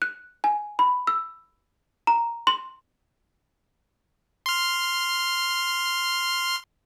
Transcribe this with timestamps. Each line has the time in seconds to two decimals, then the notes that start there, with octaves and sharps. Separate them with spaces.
0.02 F#6
0.44 G#5
0.79 B5
1.07 E6
2.07 A#5
2.47 C6
4.46 C6 F6